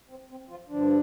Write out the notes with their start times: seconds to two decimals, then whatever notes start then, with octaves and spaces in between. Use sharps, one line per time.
0.09 C4
0.30 C4
0.49 F3 F4
0.69 G2 D3 F3 D4